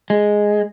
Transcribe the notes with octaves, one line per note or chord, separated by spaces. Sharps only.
G#3